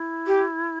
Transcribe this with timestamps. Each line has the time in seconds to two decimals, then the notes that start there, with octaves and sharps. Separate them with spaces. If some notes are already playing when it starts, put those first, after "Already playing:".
Already playing: E4
0.27 G4